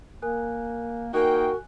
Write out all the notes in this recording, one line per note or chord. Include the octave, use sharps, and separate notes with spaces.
A#3 A#4 G#5 F#6
A#3 D#4 F#4 A#4 G5 G#5 F#6